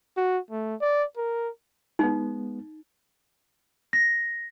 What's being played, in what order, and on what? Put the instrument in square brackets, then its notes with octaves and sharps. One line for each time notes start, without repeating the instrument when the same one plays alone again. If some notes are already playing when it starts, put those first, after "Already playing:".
[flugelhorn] F#4
A3
D5
A#4
[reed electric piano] G#3 B3 [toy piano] D#4
[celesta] A#6